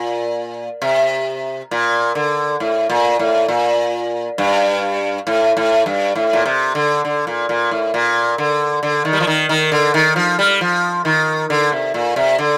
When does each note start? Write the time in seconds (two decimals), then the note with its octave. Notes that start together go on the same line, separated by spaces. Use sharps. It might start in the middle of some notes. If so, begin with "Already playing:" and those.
Already playing: A#2
0.82 C3
1.71 A#2
2.15 D3
2.60 A2
2.90 A#2
3.19 A2
3.48 A#2
4.38 G2
5.27 A2
5.57 A2
5.86 G2
6.15 A2
6.33 A#2
6.46 C3
6.75 D3
7.05 D3
7.27 A#2
7.49 A#2
7.71 A2
7.94 A#2
8.38 D3
8.83 D3
9.05 D#3
9.13 G3
9.20 F3
9.27 D#3
9.49 D#3
9.72 D3
9.94 D#3
10.16 F3
10.39 G3
10.61 F3
11.05 D#3
11.50 D3
11.72 C3
11.94 A#2
12.16 C3
12.38 D3